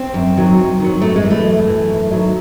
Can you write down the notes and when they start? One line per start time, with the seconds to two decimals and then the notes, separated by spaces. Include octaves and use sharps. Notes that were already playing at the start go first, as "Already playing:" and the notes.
Already playing: C4
0.14 F#2
0.37 D#3 F#3
0.57 F#2
0.80 D#3 F#3
1.01 F#2 A3
1.16 G#3
1.23 E3
1.31 A3
1.45 F#2
1.68 E3
1.89 F#2
2.11 D#3 F#3